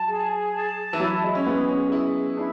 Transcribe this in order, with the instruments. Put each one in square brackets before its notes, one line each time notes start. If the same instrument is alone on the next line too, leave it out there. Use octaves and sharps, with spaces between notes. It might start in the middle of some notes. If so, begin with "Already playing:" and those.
Already playing: [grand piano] F#3 [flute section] A5
[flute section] G#4
A5
[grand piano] E3
[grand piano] F#3 [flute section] E4
[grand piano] G#3
C#4
[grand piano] B3 [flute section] G#4
[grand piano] C#4
[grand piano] E4 [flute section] G#4
[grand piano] D4 [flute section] E4